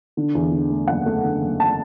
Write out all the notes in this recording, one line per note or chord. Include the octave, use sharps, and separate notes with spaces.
D3
E2
D3
A3
F#1 F#5
A3
D3
F#1
A5